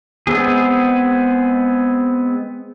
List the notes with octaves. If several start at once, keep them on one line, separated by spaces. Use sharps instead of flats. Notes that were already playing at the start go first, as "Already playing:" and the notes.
G#3 B3 C4 G#4